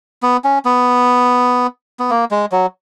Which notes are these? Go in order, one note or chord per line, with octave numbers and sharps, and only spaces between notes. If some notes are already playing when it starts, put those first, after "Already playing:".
B3
C#4
B3
B3
A#3
G#3
F#3